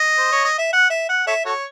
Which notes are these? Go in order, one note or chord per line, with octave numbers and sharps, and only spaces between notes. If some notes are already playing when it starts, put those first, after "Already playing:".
Already playing: D#5
C5
C#5
D#5
E5
F#5
E5
F#5
A4 C#5 E5
F#4 A4 C#5